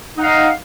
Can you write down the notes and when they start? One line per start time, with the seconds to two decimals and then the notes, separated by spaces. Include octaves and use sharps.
0.16 D#4
0.19 F#5
0.22 F5
0.25 D#5